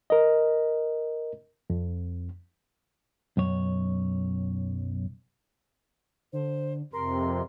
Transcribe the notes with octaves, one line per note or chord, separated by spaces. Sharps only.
A#4 D#5
F2
B1 F#2 C#5
D3 C5
F2 C3 A#4 C6